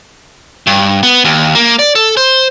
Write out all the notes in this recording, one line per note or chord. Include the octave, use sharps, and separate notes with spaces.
G2
B3
D#2
A#3
D5
A4
C5